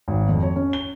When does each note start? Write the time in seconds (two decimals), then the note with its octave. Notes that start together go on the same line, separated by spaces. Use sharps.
0.08 G#1
0.29 F2
0.43 C#5
0.56 C#4
0.73 G7